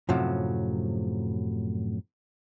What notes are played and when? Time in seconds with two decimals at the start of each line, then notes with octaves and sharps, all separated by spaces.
0.09 F#2 A2 C3 F3 F#3